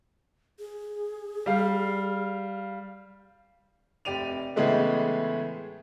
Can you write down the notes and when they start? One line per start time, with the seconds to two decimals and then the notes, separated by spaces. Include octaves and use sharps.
0.59 G#4
1.46 G3 F5
4.05 F1 G4 D5 D#7 F7
4.56 A2 C#3 E3 G#3 A3 B3